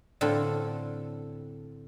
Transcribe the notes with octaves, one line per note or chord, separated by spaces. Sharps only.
A2 D3 C4 F4 A4